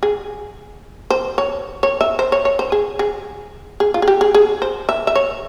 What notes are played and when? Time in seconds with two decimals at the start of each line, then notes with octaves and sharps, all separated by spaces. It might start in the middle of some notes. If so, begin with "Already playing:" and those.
0.03 G#4
1.10 C5
1.38 C#5
1.83 C#5
2.01 E5
2.19 C5
2.32 C#5
2.45 C#5
2.59 C5
2.72 G#4
2.99 G#4
3.80 G#4
3.94 F4
4.02 G#4
4.08 G4
4.21 G#4
4.35 G#4
4.62 C5
4.89 E5
5.07 E5
5.15 C#5